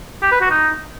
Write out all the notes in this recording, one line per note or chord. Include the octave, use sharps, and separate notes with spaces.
G4
B4
F#4
D#4